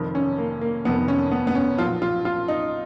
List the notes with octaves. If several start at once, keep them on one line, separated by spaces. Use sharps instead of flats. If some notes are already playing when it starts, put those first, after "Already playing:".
Already playing: F1 F2 D#3
C#4
A#3
A#3
F1 F2 D#3 B3
C#4
B3
B3
C#4
B1 A#2 F3 F4
F4
F4
D#4